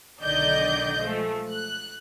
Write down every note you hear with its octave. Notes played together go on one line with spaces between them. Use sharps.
B1 D3 D#3 D5 D#5 G6
F3 G#3 A3
F#6